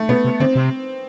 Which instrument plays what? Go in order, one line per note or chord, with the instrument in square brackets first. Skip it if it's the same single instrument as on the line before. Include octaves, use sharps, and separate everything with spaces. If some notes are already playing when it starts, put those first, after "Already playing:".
Already playing: [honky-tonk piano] A3
[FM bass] B2 [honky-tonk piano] B3
[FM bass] C3
[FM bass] D3 [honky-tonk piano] C4
[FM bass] C3